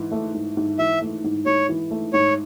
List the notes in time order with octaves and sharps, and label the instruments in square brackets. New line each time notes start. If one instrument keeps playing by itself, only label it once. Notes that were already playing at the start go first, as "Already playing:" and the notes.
Already playing: [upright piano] G#2 E3
A3
G#2
G#2
[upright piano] E3 [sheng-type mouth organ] E5
[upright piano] A3
G#2
[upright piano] G#2 [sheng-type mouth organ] C#5
[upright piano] E3
A3
[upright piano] G#2 [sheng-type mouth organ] C#5